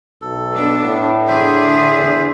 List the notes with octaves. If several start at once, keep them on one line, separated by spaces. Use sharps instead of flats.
B1 A4
B3 D4
A2
D3 D4 G#4 C5 E5
A2
E2